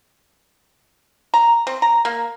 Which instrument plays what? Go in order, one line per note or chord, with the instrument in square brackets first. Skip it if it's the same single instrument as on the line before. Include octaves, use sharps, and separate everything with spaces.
[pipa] A#5
C4
A#5
A#3